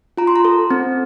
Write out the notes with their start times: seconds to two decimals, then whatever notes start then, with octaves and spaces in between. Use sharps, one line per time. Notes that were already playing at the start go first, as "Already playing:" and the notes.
0.17 F4 A#5
0.27 C6
0.36 A#5
0.45 A4
0.71 C4